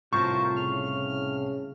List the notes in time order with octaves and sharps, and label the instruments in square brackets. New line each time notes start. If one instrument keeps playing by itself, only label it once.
[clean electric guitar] C2 A2 [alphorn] F4 [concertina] A#4 C5 A5 [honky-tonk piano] C#6
[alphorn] C#3 [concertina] F6